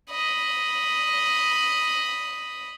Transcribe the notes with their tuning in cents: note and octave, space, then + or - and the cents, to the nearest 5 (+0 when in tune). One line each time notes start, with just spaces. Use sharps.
D#5 +0 B5 +0